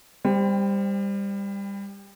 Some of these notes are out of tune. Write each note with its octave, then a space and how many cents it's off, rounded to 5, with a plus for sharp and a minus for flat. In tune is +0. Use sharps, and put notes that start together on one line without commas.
G3 +25 C5 +0 G5 +0